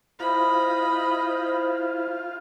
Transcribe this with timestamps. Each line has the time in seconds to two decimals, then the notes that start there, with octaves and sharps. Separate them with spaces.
0.20 E4 F4 C5 D#5 B5